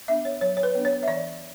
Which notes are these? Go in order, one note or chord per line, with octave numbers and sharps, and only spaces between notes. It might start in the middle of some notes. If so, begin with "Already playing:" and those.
B3 D4 E5
C#5
F#3 C#5
C#5
B4
B3 D4
C#5
E5
E3 D5